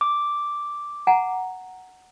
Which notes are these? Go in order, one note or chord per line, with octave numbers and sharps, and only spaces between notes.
D6
F#5 G#5 A#5